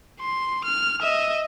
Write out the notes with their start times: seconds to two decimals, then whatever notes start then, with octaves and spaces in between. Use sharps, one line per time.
0.20 C6
0.64 F6
1.02 D#5 E5